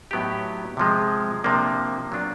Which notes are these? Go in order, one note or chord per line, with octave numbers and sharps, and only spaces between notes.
A2 F#3 B3 D#4 G4
C3 F3 G#3
C3 F3 A#3 D4
A#2 F#3 B3 D4 F4